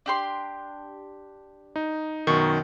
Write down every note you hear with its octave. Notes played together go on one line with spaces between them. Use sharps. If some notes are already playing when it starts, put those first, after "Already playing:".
D4 G4 C6
D#4
F#2 B2 D#3 C#6